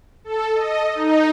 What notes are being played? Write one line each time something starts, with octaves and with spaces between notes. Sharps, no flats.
A4
D#5
D#4